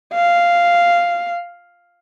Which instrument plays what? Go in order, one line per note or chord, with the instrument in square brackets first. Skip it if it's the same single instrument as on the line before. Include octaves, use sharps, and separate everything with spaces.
[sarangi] F5